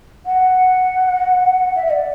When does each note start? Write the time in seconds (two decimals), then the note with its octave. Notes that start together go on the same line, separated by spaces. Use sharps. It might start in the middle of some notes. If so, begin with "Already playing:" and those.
0.25 F#5
1.75 E5
1.85 E5
1.90 D5